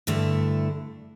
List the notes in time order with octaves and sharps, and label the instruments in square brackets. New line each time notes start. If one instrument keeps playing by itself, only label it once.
[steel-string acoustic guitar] G2 D3 A3 E4